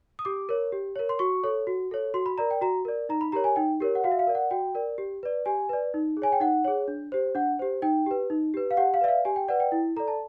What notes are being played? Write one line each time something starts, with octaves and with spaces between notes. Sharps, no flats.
D#6
G4 D6
A#4 C#5
G4
A#4 C#5
C6
F#4 C#6
A4 C#5
F#4
A4 C#5
F#4 C6
B5
A#4 D5 A#5
G5
F#4 A#5
A#4 D5
D#4 A#5
B5
G4 A#4 C#5 A#5
G#5
D#4 G5
G4 A#4 C#5
F#5
F#4 F5
E5
F5
A#4 D5
F#5
F#4 G5
A#4 D5
G4
B4 D5
G4 G#5
B4 D5
D#4
G#4
C#5 G#5
G5
D#4 F#5
G#4 C#5
D4
G4 C5
D4 F#5
G4 C5
D#4 G5
G4 B4
D#4
G4 B4
F5
G4 F#5
F5
B4 D5 E5
F5
G4 G#5
G5
B4 D5 F#5
G5
E4
A4 D5 A#5
A5